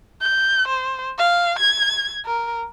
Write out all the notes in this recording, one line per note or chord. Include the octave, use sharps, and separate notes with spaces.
G6
C5
F5
G#6
A#4